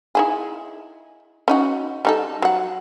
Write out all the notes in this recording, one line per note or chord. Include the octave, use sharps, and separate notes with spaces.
D#4 E4 G#4
C#4 D#4 F#4
G3 D#4 A4
F#3 F#5